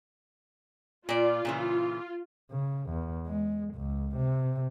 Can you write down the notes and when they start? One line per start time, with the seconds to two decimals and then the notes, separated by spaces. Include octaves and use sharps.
1.09 A#2 F4 D5
1.45 A#2 C#3 E3
2.51 C#3
2.90 E2
3.27 G#3
3.74 C#2
4.16 C3